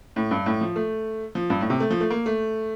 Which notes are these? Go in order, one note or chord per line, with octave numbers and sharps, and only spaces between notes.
A2
G2
A2
F3
A3
F3
G2
A2
C3
A3
F3
A3
A#3
A3